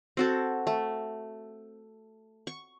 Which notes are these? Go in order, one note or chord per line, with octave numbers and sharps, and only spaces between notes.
C4 F#4 A4
A3
C#6